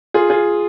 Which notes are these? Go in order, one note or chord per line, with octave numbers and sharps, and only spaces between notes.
F4 G#4
F4 G#4